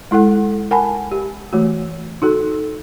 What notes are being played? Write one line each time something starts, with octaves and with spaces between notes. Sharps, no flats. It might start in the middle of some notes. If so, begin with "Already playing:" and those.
G#3 E4 A4 F#5
A#4 F#5 G#5 A5 B5
G4
E3 A3 F#4
D#4 F#4 A4